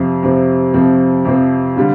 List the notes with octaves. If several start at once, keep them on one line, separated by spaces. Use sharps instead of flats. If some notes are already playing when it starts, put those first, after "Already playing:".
Already playing: F2 C3 F3 C4
F2 C3 F3 C4
F2 C3 F3 C4
F2 C3 F3 C4
D3 G3 D4 F4